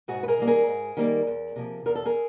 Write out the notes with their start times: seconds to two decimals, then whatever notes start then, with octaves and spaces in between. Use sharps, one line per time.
0.08 G#2 F#4 G#4
0.23 B4
0.28 G#4 A#4
0.38 D#3 G3 A#3
0.47 G#4 A#4
0.67 G#2
0.97 D#3 G3 A#3
1.27 E2
1.56 C3 F3 A#3
1.86 E2 A#4
1.95 A4
2.05 G#4 A#4